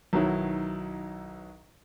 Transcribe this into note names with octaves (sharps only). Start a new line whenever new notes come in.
B1 D#3 F#3 E4